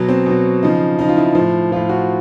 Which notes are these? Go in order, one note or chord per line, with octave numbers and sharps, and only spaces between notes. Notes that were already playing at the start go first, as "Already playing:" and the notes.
Already playing: B2 F#3
C4
B2 F#3
C#3 F3 D#4
C#3 F3 D#4
F4
E4
A2 F3
A2 F3 F4
F#4